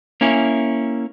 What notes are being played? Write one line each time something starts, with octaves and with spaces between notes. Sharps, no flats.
A#3 C#4 E4 G#5